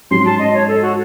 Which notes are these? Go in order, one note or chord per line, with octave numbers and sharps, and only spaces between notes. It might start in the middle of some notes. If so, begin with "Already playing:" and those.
G#2 F#3 C#4 C6
A5
D#5
C#5
A4
F#4